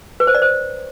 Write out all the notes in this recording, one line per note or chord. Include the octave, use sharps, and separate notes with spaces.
B4
C5
D5
C5